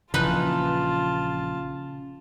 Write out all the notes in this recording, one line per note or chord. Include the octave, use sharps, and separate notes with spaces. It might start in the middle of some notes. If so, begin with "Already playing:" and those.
A#1 C#3 E3 D#4 F4 B4 D#5 A5